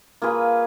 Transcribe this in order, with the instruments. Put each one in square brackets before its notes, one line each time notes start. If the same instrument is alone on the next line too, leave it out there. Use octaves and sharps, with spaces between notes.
[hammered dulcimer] A#3 F4 G#4 B4